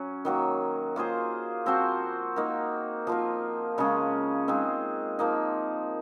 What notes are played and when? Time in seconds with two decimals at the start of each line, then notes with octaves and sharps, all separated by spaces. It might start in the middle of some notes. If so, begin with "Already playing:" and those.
Already playing: F#3 C#4
0.25 D#3 F#3 A#3
0.96 A#3 F4 G#4 C5
1.66 F3 C4 F#4 C5
2.36 A#3 D#4 A#4
3.07 F3 A#3 F4 A#4
3.78 C#3 G#3 C#4 G#4
4.48 G#3 C4 D#4
5.19 F3 A#3 D#4